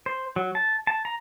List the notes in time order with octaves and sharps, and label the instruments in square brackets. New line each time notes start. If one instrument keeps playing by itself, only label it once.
[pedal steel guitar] C5
F#3
A5
A5
A#5